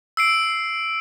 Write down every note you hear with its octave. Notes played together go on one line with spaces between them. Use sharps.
E6 C7 D7